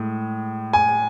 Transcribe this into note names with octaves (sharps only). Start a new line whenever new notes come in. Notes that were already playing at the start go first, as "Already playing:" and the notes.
Already playing: A2 G#3
G#5